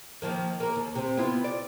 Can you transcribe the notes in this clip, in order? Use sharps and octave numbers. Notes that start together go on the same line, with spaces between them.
D#3 F3 A#3
A#3 A#4
D#2
C3 C4
B3 E4 F4
D5